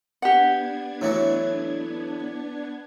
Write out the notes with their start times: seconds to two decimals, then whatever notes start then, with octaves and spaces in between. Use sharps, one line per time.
0.22 B3 D4 G4 F#5 G#6
1.01 A2 E3 F#3